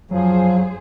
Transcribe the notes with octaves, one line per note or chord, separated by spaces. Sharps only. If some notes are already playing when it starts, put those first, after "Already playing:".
F#2 F3 F#3 G#4 C5